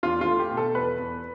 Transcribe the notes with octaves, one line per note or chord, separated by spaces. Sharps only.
E2 F4
F4
A3
G4
B2
A4
E2 B4
E2